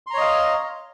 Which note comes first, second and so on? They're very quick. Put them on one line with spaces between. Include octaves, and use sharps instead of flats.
C6 A#5 C#5 D#5 F5